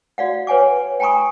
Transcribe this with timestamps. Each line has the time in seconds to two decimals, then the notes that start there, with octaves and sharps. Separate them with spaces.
0.18 F#4 D5 F5 F#5
0.47 B4 C#5 F#5 G#5 D6
1.00 G5 G#5 A#5 B5 C#6 D#6